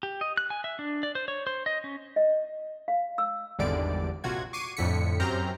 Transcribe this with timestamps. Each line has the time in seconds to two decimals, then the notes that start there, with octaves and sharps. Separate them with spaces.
0.03 G4
0.21 D#5
0.37 F#6
0.50 G#5
0.64 E5
0.79 D4
1.03 D5
1.15 C5
1.28 C#5
1.47 C5
1.66 D#5
1.84 C#4
2.16 D#5
2.88 F5
3.18 E6
3.59 G#1 E2 D3 G3 D5 D7
4.24 A#1 C3 F4 F#4 G#6
4.53 C#6 D6 C7 D#7
4.77 F2 A2 D3 B6 C#7
5.20 F#2 C4 G4 A#5 F6 G6